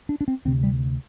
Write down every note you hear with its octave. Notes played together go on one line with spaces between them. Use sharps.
D4
D4
C4
D2 C3 C4
G3